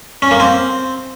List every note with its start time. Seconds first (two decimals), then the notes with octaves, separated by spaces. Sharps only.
0.22 C#4
0.31 A#3
0.40 C4